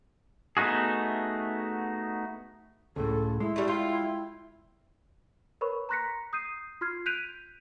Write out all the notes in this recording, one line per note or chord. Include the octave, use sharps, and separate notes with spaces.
A3 B3 D#4 F#4 G#4
C#2 A2 A4
G#3 E4
G3 A3
F4 G5
A#4 B4 C#5 B5 C#6
A#5 C6 F#6 A#6 B6 C#7
D#6 G6 C7 D#7
F4 C6 F6 G#6 C7
F#6 G6 B6 D7 D#7 F7